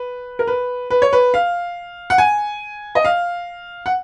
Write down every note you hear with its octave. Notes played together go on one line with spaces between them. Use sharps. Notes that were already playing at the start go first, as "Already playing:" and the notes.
Already playing: B4
A#4
B4
B4
C#5
B4
F5
F#5
G#5
D#5
F5
F#5